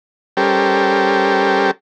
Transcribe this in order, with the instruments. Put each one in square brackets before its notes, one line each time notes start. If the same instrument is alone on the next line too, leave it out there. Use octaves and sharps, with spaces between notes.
[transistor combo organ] G3 C#4 G4 A4 A#4 C5